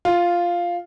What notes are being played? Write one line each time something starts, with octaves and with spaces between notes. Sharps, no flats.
F4